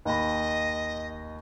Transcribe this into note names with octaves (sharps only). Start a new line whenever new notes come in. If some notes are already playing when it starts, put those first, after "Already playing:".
D#2 D#5 B5